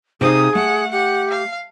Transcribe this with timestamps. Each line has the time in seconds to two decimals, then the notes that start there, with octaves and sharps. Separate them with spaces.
0.21 C3 D#4 G#4 F5 D#6
0.55 A3 F#5
0.92 G4 F#5
1.31 F5